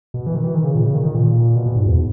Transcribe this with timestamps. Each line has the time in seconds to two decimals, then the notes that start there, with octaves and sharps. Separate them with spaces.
0.14 B2
0.27 E3
0.35 D#3
0.44 E3
0.54 D#3
0.64 C#3
0.75 A#2
0.85 C#3
0.95 D#3
1.05 D#3
1.15 A#2
1.55 B2
1.66 B2
1.76 G#2
1.86 E2